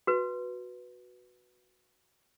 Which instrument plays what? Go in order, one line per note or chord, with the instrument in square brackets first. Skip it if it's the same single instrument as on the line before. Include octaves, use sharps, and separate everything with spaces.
[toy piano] F#4 B4